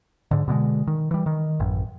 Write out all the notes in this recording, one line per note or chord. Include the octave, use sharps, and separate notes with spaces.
G#2 D3
B2 D3 G3 G#3
D#3
E3 G3
D#3
A1 F#2